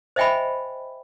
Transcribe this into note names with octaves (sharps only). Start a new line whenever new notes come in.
C5 D#5 E5 G5 G#5 B5